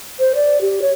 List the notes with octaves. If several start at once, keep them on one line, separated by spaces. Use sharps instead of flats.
C5
D5
G4
C#5